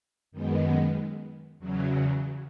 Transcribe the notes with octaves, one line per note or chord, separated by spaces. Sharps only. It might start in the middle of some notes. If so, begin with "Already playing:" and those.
F#2 D#3 G#3 B3
E2 C#3 F#3